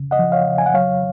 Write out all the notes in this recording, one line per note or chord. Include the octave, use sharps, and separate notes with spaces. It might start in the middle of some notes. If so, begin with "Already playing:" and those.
Already playing: C#3
D#5 F#5
F3
C#5 F5
C#3
G#5
F#5
F#3 C#5 F5